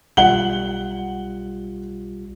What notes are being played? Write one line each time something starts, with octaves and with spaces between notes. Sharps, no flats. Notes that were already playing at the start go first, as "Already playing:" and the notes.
B1 G3 F4 F#5 F#7 G7